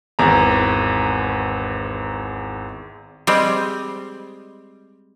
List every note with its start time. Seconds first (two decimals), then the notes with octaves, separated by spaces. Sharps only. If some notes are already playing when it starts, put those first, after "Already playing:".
0.19 G#1 E2 A#5
3.27 G3 G#3 C4